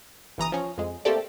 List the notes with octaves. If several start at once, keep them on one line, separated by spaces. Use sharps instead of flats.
G1 E3 A#5 D#6
F3 C#4
F2 G#3
A3 A#3 C4 G4 A4 D5